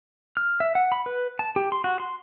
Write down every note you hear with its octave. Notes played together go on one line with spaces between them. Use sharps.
F6
E5
F#5
B5
B4
A5
G4
C6
F#4
C6